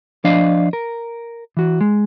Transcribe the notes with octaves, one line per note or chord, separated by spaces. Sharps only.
F3 D4 D5 D#5 F5
A#4
E3 F#4
G#3